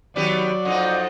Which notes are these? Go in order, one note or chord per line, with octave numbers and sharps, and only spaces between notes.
D#3 F#3 B3 G4 D5
F2 D#4 F4 D#5 F#5